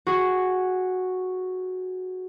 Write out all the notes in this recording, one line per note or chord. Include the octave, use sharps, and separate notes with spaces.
F#4 G#4